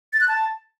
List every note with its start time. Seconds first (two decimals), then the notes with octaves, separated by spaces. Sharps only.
0.13 A6
0.21 F#6
0.28 A5